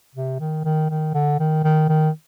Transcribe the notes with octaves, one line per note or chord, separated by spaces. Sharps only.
C3
D#3
D#3
D#3
D3
D#3
D#3
D#3